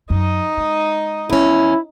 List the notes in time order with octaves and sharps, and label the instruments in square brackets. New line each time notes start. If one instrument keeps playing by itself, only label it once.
[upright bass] F#2 [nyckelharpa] D#4 D#5
[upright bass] G#3
[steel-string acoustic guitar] E2 C#4 [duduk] E4